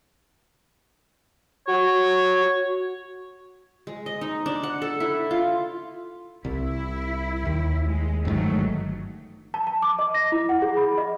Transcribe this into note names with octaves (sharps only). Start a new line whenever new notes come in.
F#4 C#5
G#3
D#5
D#4
D4
F#5
A4
E4
F4
C2 E4
D#2
G#3
G1 G#2 C3 D#3 F#3 A3
A5
A5
D6
D#5
A#6
E4
F#5
G#4
B5
D#5